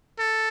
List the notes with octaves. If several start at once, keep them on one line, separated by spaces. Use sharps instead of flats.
A4